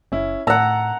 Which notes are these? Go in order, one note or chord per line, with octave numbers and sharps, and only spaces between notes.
F#1 C#4 E4
A2 F#5 A5 A#5 E6